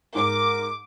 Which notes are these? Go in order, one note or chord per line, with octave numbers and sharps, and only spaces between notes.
G#2 A#4 D6